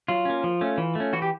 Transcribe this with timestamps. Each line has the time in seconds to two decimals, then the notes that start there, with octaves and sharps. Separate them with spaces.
0.08 F#3 F4
0.25 A#3 C#4
0.44 F3
0.61 A3 C#4
0.78 E3
0.95 A3 C#4
1.13 E3 F#4
1.22 G4